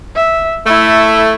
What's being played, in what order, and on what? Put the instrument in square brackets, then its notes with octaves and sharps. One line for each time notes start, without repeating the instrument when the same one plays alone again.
[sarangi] E5
[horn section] A3 [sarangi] E4